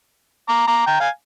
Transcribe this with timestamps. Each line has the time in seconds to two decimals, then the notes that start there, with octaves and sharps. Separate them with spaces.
0.49 A#5 D6
0.67 A#5 D6
0.86 G5 A#5
1.00 F5 G#5